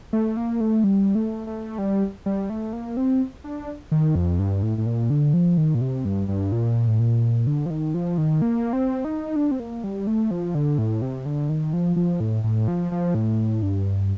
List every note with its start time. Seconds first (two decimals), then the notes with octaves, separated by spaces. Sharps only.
0.13 A3
0.37 A#3
0.61 A3
0.84 G3
1.15 A3
1.47 A3
1.78 G3
2.26 G3
2.50 A3
2.73 A#3
2.97 C4
3.44 D4
3.92 D#3
4.15 F2
4.39 G2
4.63 A2
4.78 A2
4.86 A#2
5.10 D3
5.34 F3
5.57 D#3
5.75 A#2
5.81 C3
6.05 G2
6.28 G2
6.52 A#2
6.88 A2
6.99 A#2
7.47 D3
7.66 F3
7.70 D#3
7.94 F3
8.18 D#3
8.42 A#3
8.73 C4
9.05 D#4
9.36 D4
9.51 C4
9.60 A#3
9.84 G3
10.07 A3
10.31 F3
10.55 D3
10.78 A2
11.02 C3
11.26 D3
11.49 D#3
11.73 F3
11.96 F3
12.20 A2
12.44 A2
12.68 F3
12.92 F3
13.15 A2
13.63 G2